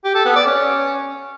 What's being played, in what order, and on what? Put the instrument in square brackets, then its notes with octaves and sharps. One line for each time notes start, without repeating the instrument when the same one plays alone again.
[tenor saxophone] G4
A4
B3
D5
C#4